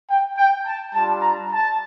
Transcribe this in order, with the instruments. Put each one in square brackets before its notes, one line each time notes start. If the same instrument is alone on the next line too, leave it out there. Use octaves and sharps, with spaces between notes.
[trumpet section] G5
G5
A5
G3 D4 F4 A5
A#5
A5